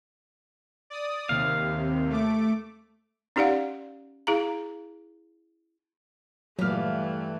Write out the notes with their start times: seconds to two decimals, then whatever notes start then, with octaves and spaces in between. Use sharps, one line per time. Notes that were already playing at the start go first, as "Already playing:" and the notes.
0.90 D5 D#6
1.29 D#2 C3 F5
2.10 A3 D6
3.36 C#4 D#4 G4 D5 F5 F#5
4.27 E4 G#4 F5 A#5
6.59 E2 G2 A#2 E3 F#3 A3 G4 F5